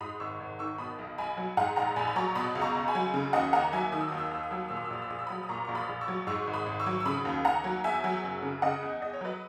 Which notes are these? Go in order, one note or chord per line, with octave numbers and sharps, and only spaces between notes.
G#2 B5 D#6
G#1 C#6 E6
G#1
D#3 C#6 E6
B2 B5 D#6
B1
B1 G#5 B5
F#3
G#2 F#5 A#5
A#1 F#5 A#5
A#1 G#5 B5
B5
F#3 A#5 C#6
B2 B5 D#6
C#2
A#5 C#6
C#2
G#5 B5
F#3
C#3
D#2 D#5 F#5
D#2 F#5 A#5
F#3 E5 G#5
D#3 D#6
E6
D#6
D#2
E6
D#6
D#2 E6
D#6
F#3 E6
D#6
A#2 E6
D#6
E6
A#1 D#6
E6
A#1 D#6
E6
F#3 B5 D#6
D#6
A#2 A#5 C#6
A#1 C#6
B5 D#6
A#1
C#6 E6
F#3
G#2 C#6 E6
G#1
B5 D#6
G#1
C#6 E6
F#3
E6
C#3 B5 D#6
D#2
D#2 F#5 A#5
F#3
E2 E5 G#5
F#3
F#1
C#3
C#3 D#5 F#5
E2
E2 D#5
C#5
F#3 B4 D#5